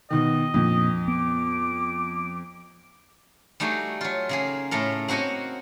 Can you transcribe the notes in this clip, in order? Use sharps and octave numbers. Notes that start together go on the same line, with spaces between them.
B2 D#3 D#5
F2 A#2 A#3 D4
B3 D6
G3 A3 D#4 F#4 G#4
F#3 F4
C#3 A#3 G#4
A2 A3 A4 A#4
A#3 C4 F#4 C#5 D#5